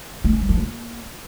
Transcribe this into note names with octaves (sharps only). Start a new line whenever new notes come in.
A#3
C#4
F#3
F3
A#3